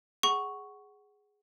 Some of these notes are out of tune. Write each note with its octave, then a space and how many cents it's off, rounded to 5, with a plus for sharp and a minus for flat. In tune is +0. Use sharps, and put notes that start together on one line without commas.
G#4 +0 F#5 +15 C#6 +0